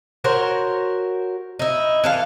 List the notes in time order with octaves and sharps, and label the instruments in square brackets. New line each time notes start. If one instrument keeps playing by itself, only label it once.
[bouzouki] F#4 A#4 C5 C#5
D#4 E4
E3 A4 F5